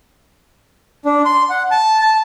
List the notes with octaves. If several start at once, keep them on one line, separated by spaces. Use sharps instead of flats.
D4
C6
F#5
A5
A5